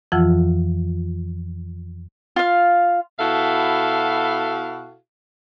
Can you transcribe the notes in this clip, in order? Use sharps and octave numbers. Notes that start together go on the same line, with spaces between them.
F2 E3 F3 F4 F#5 E6
F4 F5
B2 E4 F#4 A4 E5 F5